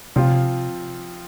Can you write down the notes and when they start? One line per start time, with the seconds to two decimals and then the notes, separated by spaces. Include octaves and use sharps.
0.16 C3 F3 C4 F4